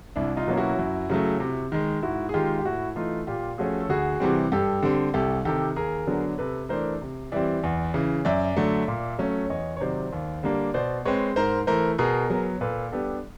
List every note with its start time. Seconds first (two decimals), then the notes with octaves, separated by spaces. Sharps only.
0.16 C2 D4 E4
0.37 D#4 F4
0.47 B2 F#3 A#3 C#4
0.57 E4 F#4
0.79 F#2
1.10 C#3 F#3 A3
1.40 C3
1.72 D#3 G#3
2.03 G#2 E4 F#4
2.29 G#4
2.34 D#3 G#3 F4 G4
2.59 G4
2.65 A2 E4 F#4
2.96 E3 A3 D#4 F4
3.27 A#2 F4 G4
3.58 F3 A3 C#4 F#4 G#4
3.80 A4
3.89 D2 F#4 G#4
4.20 C3 E3 G3 C4
4.52 G2 G4 A4
4.83 D3 G3 C4
5.14 C2 G4 A4
5.45 C3 D#3 G4 A4
5.76 D#2 G#4 A#4
6.07 D3 F#3 B3 D4
6.38 C3 A4 B4
6.69 E3 A3 D4 A#4 C5
7.01 C3
7.32 E3 G3 C4 D5 E5
7.63 E2
7.94 C#3 E3
8.25 F#2 D5 E5
8.57 D3 F#3 A3
8.88 A#2
9.19 F#3 A3 C#4
9.50 E2 C#5 D#5
9.77 C#5
9.80 C3 D#3 F#3 C5 D5
10.13 D#2
10.43 D3 G3 A#3 D4
10.74 B2 C5 D5
11.05 G#3 C4 B4 C#5
11.36 G#2 A#4 C5
11.67 E3 A3 A#4 C5
11.98 B2 G#4 A#4
12.30 F#3 B3
12.61 A#2 A4 B4
12.92 G3 B3 D4 G4 A4